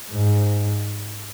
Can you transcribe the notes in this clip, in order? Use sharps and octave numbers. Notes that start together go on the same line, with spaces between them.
G#2